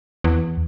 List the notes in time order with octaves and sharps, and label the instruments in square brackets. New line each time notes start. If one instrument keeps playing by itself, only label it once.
[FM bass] E2